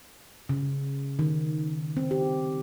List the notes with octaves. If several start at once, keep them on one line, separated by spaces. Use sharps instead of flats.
C#3
D#3
C4
G4